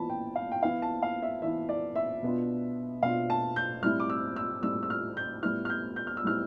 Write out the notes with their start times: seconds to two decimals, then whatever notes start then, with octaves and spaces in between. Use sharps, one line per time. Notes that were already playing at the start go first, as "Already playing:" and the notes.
Already playing: E3 B3 F4 A5 B5
0.10 G5
0.36 F5
0.52 G5
0.62 E3 B3 E4 F5
0.82 A5
1.02 F5
1.22 E5
1.42 E3 B3 E4 E5
1.69 D5
1.96 E5
2.23 B2 B3 D4 F4
3.03 B2 B3 D4 F4 F5
3.30 A5
3.56 G6
3.83 A2 G3 C4 E4 F6
4.00 D6
4.10 E6
4.36 E6
4.63 A2 G3 C4 E4 E6
4.83 E6
4.90 F6
5.17 G6
5.43 A2 G3 B3 E4 F6
5.65 F6
5.70 G6
5.96 G6
6.07 F6
6.17 E6
6.23 A2 G3 B3 E4 F6